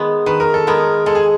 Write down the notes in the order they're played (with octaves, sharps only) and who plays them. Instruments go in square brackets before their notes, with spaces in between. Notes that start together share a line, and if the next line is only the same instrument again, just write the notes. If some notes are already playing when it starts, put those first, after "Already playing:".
Already playing: [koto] D#3 G#3 B3
[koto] D#3 [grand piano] B4
[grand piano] A#4
A4
[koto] G#3 B3 [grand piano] A#4
[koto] G#3 [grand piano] A4
[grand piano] G#4